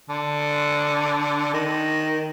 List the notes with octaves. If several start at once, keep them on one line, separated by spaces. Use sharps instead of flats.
D3
D#3